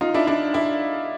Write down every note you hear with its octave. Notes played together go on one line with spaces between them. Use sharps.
D#4 F4
D4 E4
D4 E4
D4 E4